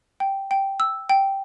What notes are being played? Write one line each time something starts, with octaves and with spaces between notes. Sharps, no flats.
G5
G5
E6
G5